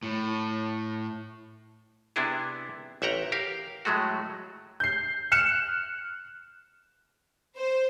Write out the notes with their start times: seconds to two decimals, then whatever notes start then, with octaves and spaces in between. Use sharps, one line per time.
0.03 A2
2.16 C3 B3 D4 E4 G#4
3.02 A1 E5 F#5 G5 A#5
3.32 G4 A#4 F5
3.85 A2 F#3 G#3 A3 F#4
4.80 G6 C7
5.32 F6 F#6 C#7 E7
7.57 C5